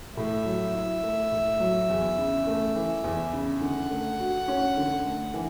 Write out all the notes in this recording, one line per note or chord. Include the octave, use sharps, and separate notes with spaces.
A2 E5
F#3
E4
A3
A2
F#3
E2
C#3
A3
E3
E2
C#3
D3 F#5
A3
F#4
C#4
D3
A3
E3